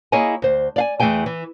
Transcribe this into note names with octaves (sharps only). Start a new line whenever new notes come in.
A#3 E4 G#4 C#5 D#5 G#5
D2 C5
D5 F5 G#5
E2 E3 A3 G#4 G5 G#5
E3